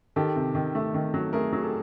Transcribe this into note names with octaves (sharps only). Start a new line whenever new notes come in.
D#3 G4 A4
C3
D#3
A3
D#3
F#3
A3 G#4 A#4
F#3
G4 A4